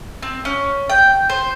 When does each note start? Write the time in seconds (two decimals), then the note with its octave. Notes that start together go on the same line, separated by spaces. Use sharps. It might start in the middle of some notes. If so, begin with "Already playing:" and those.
0.22 C4
0.45 C#4
0.90 G5
1.29 C5